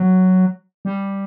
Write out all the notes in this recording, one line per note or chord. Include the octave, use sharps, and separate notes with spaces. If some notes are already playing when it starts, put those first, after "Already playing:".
Already playing: F#3
G3